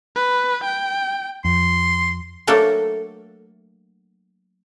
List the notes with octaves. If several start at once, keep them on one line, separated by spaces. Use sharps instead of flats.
B4
G5
F2 C6
F#3 A3 A#3 D4 A4 A#4